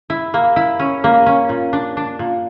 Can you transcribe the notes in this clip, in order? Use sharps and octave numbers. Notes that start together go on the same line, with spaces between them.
E4
A#3
E4
C#4
A#3
C#4
A#2
D4
D4
A#2